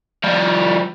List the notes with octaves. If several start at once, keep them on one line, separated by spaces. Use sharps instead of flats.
F3 G3